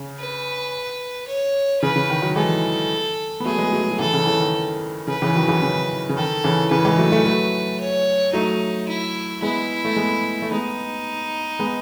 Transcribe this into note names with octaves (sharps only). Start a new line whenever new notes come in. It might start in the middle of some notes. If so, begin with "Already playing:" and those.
Already playing: C#3
B4
C#5
C#3 B4
C#3
D#3
D#3 F#3
E3 G#3 A4
B3
F#3 A3 G#4
G#3 B3
F#3 A3
G#3
F#3
C#3 E3 A4
C#3 E3
C#3 E3
D#3
C#3 B4
C#3 E3
D#3 F#3
C#3 E3
C#3
C#3
D#3 A4
C#3 E3
C#3 E3 B4
E3 G#3
F#3 A3
F#3 A3
F#3 A3
C#5
F#3 A3 D#4
E4
G#3 B3 E4
A3
G#3 B3
A3
G#3 B3 D#4
G#3 B3